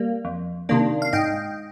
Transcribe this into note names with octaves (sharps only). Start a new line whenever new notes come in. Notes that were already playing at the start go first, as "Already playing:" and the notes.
Already playing: G3 A#3
F2
C3 D#3 A#3 D4
F5
G#2 D#5 G5